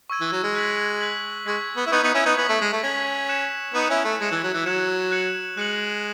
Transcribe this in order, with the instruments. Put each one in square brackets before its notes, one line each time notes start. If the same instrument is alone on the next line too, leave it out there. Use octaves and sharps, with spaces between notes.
[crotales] C#6 E6 G#6 D#7
[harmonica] E3
F#3
G#3
[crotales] F#6 B6 F#7
F#6 B6 F#7
[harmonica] G#3 [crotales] C#6 G#6 B6
[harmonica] B3
E4
[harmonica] B3 D#4 [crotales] C#6 G#6 B6
[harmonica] B3 D#4
C#4 E4
B3 D#4
[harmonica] B3 [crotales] G#6 B6 F#7
[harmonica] A3
G#3
A3
[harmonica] C#4 [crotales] G#6 B6 F#7
[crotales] F#6 C#7 E7
[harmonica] B3 D#4 [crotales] F#6 C#7 E7
[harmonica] C#4 E4
A3
[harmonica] G#3 [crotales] G#6 C#7 E7
[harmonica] E3
F#3
E3
[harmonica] F#3 [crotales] G#6 C#7 E7
[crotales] F#6 C#7 F#7
[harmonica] G#3 [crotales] F#6 C#7 F#7